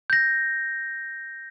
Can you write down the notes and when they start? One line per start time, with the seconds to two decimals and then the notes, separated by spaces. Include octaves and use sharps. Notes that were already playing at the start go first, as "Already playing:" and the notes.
0.10 G6 A#6